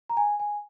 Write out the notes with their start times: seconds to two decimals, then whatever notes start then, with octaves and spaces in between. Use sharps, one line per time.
0.10 A#5
0.17 G#5
0.40 G#5